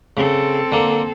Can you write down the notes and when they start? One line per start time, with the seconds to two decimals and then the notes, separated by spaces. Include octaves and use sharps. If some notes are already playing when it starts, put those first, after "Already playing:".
0.17 C#3 C4 A4
0.72 D3 A#3